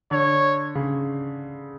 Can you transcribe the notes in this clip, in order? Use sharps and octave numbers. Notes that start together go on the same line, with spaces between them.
D3 C#5
C#3